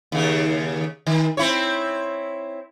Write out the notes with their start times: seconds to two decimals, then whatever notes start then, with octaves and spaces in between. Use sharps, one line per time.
0.12 D#2 C#3
1.07 D#3
1.37 C4 E4 C#5